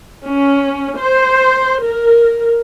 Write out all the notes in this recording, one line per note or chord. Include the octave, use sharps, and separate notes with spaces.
C#4
C5
A#4